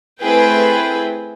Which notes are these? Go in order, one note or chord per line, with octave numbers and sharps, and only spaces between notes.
A3 C4 E4 G#4 B4 G5